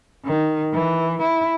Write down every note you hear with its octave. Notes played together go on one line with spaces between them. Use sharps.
D#3
E3
E4